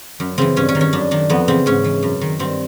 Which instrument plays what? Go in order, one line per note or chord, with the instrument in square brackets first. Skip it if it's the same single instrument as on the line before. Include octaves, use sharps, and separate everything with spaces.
[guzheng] F#2
C#3 E3 C4
G2 C#4
C#4
D#3
C#4
F#2 D4
D#3 D4
F2 B3
C#3 E3 C4
G#2 C#4
E3
F#2
D#3
G2 C4